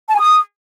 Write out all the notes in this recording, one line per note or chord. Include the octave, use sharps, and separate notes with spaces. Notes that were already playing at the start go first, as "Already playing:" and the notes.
A5
G#5
D#6